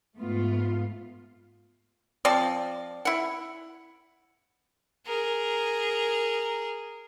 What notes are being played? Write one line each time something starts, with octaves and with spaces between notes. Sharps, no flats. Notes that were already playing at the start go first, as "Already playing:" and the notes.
G#2 A3 B3 F4
F3 C4 D5
E4 F#5
G#4 A#4